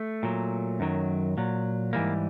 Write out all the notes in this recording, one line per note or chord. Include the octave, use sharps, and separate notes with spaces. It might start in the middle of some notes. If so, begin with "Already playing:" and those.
Already playing: A3
A#2 F#3
F#2 D#3 F#3
A#2 F#3
G#2 E3 G3 A#3